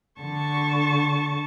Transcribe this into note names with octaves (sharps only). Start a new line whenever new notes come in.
D3 A5 C#6